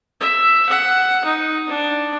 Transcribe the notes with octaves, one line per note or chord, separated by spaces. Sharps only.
E5
F#5
D#4
D4